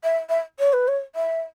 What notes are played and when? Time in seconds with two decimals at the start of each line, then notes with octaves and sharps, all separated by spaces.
0.04 E5
0.29 E5
0.60 C#5
0.73 B4
0.88 C#5
1.15 E5